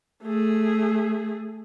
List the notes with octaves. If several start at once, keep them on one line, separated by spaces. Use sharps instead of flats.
A3 G#4